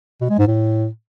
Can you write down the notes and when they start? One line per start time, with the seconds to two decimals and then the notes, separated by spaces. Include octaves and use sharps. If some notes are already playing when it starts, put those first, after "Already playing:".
0.21 B2
0.30 G#3
0.39 G#2
0.48 A2